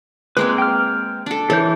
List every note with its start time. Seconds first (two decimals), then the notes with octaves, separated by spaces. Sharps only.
0.37 G#3 A#3 C4 B4
0.58 G5 F6
1.26 D4 A4
1.50 E3 A4 C#5 G6